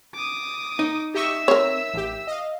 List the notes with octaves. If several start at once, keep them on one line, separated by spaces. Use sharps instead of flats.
D6 D#6
D#4
G4 D#5 E5 C#6 E6
C4 A#4 C#5
A1 G4
D#5 F5